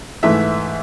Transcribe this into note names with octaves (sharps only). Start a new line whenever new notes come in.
G#2 E3 A3 E5